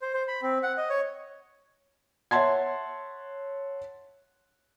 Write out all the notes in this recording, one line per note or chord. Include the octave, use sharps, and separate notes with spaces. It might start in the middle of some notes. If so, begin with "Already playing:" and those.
C5
C5
B5
C4
F#5
D#5
C#5
C#5 E5 F#5 A5 C6 G#6